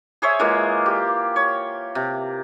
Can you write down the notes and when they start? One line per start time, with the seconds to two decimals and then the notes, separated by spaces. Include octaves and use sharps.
0.22 G#4 C5 C#5 E5
0.39 E3 G#3 A#3 F4
0.86 G4
1.36 C#5
1.95 C3